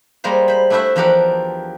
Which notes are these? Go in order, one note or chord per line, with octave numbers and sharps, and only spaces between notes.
G3 G#3 A#3 C5
C5 B5
A3 D4 E4 F#4 C5 E5
E2 F3 D4 G4 A#4 F#5